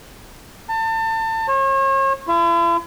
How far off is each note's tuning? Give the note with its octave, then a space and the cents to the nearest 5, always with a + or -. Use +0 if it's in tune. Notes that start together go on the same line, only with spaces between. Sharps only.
A5 +30
C#5 -40
E4 +45